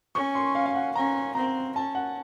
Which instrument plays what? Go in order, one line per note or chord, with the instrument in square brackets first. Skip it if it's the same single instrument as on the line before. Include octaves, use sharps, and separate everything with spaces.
[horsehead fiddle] C#4 [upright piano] C#6
[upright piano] C6
F5
F5
F#5
[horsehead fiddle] C#4 [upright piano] A#5
[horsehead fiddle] C4 [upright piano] A#5
[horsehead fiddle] C#4 [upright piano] A5
[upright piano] F#5